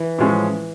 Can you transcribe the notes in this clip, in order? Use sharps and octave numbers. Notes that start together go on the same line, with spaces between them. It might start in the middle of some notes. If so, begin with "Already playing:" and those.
Already playing: E3
A2 F3 G#3 C#4